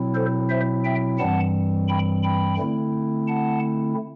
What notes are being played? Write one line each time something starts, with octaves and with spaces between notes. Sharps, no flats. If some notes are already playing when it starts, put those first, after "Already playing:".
Already playing: B2 F#3 C4 E4
A4 C5
C5 E5
E5 G5
G2 E3 G3 C4 F#5 A5
G5 B5
G5 B5
D3 A3 C4 E4
F#5 A5